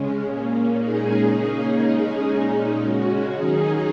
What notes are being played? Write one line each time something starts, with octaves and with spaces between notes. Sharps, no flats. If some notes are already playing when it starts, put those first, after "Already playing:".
Already playing: C#3 G#3 C#4
A#2 A#3 C#4
A#2 G#3 C#4 D#4 G#4
C#3 A#3 C#4 D#4 G#4
C#3 G#3 C#4 D#4 G#4
A#2 G#3 C#4 D#4
C#3 G#3 C#4 F#4
D#3 F#3 C#4 D#4 G#4